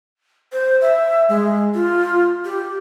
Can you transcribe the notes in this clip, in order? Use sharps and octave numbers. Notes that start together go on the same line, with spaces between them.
C5
E5
G#3
F4
G4